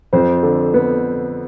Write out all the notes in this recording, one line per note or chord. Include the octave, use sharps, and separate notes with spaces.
F2 C5
D3
B3